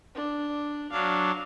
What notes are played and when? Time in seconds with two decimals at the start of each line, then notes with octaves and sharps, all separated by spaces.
0.15 D4
0.92 F#3 D4 F5